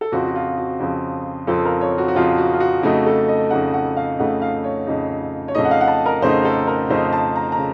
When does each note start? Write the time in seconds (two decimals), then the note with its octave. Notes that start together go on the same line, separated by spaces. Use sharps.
0.01 A4
0.12 F2 C#3 F3 C4 F#4
0.28 F#4
0.35 F4
0.57 F#4
0.80 F2 C#3 F3 C4
1.47 F2 C#3 F3 C4 A4
1.65 A#4
1.81 C#5
1.98 F#4
2.08 F#4
2.15 F2 C#3 F3 C4 F4
2.38 F#4
2.53 F4
2.60 F#4
2.83 F2 C#3 A3 D#4 F#4
3.06 A4
3.28 D#5
3.50 F2 C#3 A3 D#4 F#5
3.74 F#5
3.96 F5
4.19 F2 C#3 A3 D#4 F#5
4.41 F5
4.64 C#5
4.87 F2 C#3 A3 D#4
5.48 C#5
5.54 F2 C#3 A3 D#4 D#5
5.65 F#5
5.71 F5
5.81 F#5
5.88 A5
6.06 A#4
6.22 F2 C#3 A3 D#4 C5
6.45 A4
6.67 A#4
6.90 F2 C#3 A3 D#4 C5
7.13 A5
7.36 A#5
7.52 A#5
7.58 C#3